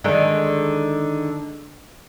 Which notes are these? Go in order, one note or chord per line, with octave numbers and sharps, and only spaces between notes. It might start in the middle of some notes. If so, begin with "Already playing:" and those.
D3 D#3 G#3